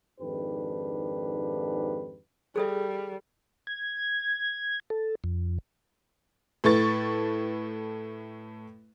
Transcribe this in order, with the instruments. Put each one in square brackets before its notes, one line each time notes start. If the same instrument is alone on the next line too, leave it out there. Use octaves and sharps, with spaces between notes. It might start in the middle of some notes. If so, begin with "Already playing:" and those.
[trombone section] F2 G#2 D#3 D4 G4 B4
[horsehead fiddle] G3 [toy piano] G#4 A4 E5
[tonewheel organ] G#6
A4
F2
[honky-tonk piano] A2 A3 B4 C#6 A6